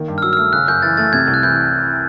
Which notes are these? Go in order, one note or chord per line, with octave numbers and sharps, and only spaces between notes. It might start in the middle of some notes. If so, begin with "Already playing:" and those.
Already playing: D#3 A#3
G2
F6
F#3 E6
F6
A3 E6
C#3 F#6
F#2 G6
E3 A6
A3 A6
C3 G#6
C2
F#6
E3 G6